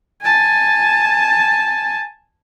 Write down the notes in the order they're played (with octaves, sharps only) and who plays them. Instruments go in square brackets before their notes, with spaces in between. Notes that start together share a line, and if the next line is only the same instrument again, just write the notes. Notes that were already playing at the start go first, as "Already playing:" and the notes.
[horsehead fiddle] G#5 A5